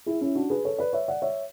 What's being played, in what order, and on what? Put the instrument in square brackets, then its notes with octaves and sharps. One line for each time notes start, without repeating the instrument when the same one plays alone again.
[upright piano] E4 G#4
C#4 E4
D4 F#4
G#4 B4
A4 C#5
B4 D5
C#5 E5
D5 F#5
C#5 E5